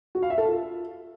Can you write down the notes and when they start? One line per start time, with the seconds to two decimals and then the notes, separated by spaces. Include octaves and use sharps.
0.15 F#4
0.23 F5
0.30 E5
0.38 A4
0.46 F4